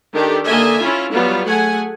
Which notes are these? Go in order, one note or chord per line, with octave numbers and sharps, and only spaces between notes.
D#3 D4 G4 A4
D3 A#3 D#5 E5 G#5
C#4 E4 F4
F#3 G3 B3 F4
A3 G#4 F#5 G#5